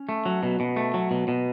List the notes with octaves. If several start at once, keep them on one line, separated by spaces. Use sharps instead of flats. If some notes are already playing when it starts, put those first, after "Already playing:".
Already playing: C#4
A3
F#3
B2
B2
A3
F#3
B2
B2